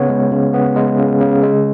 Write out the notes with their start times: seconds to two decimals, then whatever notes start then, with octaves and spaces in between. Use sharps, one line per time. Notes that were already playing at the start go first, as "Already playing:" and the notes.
Already playing: C#3 B3 C#5
0.09 G#3
0.31 C#3
0.54 B3
0.76 G#3
0.99 C#3
1.20 C#3
1.43 G#3